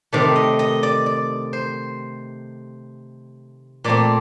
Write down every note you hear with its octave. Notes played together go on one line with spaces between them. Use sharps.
C3 D#3 A3 D5
D#5
D#5
D5
D5
C5
A#2 A3 C4 D5